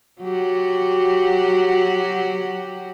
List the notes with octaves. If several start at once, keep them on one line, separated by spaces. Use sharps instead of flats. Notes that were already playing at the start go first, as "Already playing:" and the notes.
F#3 F#4 G4